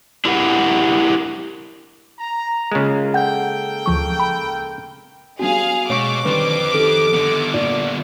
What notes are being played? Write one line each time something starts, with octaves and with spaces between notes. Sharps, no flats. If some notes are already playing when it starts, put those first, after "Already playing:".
D4 E4 G4 A#4 C#5 F#5
A#5
C#3 G#3 A#3 F4
A#3 A4 F#5 G5 G6
D2 F3 C#6
B5
G3 B3 D4 F#4 G#4 F5
B2 G#3 C#5 C#6 D6
F2 D3 D#3 G3 B4 C5
D#3 D#4 G4 A4
D3 B3
A#2 D5